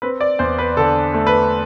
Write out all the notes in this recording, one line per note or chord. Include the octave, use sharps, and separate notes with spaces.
C4 B4
D5
E2 C5
B4
D3 A4
A3
B4